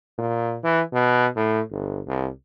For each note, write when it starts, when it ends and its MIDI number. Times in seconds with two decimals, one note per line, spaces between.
0.18 0.58 46
0.64 0.81 52
0.93 1.26 47
1.36 1.61 45
1.71 2.00 31
2.07 2.29 36